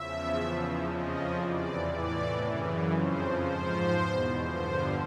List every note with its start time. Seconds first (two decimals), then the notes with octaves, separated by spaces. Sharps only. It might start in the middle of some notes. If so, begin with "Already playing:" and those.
Already playing: E2 C#3 F3 E5
0.42 E2 C#3 F3
0.92 F2 C#3 F3 D#5
1.42 E2 C3 E3 D5
1.92 A2 E3 D5
2.43 F#2 C#3 E3
2.93 F2 C#3 F3 C5
3.43 G#2 F3 C5
3.93 E2 B2
4.44 G2 D3 F3 C5